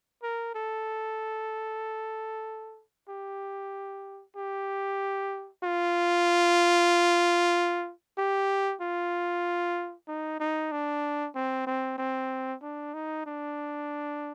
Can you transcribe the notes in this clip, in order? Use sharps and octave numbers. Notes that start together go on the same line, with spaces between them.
A#4
A4
G4
G4
F4
G4
F4
D#4
D#4
D4
C4
C4
C4
D4
D#4
D4